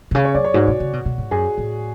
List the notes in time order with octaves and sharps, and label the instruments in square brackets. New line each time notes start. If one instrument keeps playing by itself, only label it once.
[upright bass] B2
[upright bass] C#3 [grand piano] G#4
[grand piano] C#5
[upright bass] F#2 [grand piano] D5
[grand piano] C#5
[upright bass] G#2 [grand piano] F#4
[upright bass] B2
C#3
B2
B2
G#2
[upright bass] F#2 [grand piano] G#4
[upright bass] A2